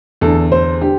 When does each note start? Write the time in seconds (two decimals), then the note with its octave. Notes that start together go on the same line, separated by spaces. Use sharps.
0.21 E2 D3 A4
0.52 C5
0.81 D3 G4